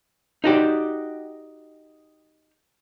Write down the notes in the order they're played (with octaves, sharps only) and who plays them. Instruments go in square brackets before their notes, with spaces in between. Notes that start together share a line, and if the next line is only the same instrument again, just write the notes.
[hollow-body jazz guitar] D#4 F#4 G4 D5